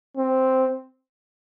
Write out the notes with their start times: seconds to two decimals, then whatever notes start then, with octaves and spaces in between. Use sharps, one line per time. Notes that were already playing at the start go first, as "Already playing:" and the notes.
0.17 C4